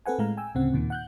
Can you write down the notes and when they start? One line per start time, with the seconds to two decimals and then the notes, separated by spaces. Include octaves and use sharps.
0.06 C4 A4 B4 F#5 G#5
0.18 A2 G#3 F5 A#5
0.37 G5 G#5 E6
0.55 D2 A2 C#3 C4 F#5
0.73 D#2 A#2 D#3
0.90 F#5 F#6 G6